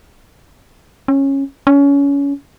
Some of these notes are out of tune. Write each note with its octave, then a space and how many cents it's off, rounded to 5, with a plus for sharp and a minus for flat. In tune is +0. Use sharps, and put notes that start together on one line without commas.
C#4 -15
C#4 +25